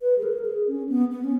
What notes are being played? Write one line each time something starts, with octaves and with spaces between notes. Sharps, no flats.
B4
G#4
A#4
G#4
C#4
B3
B3
C#4